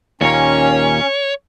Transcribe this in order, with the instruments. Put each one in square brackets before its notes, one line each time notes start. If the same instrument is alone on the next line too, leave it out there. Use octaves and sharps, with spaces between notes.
[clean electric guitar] D#2 A#2 A#3 [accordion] C#4 [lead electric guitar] C#5